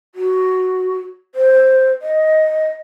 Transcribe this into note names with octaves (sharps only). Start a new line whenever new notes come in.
F#4
C5
D#5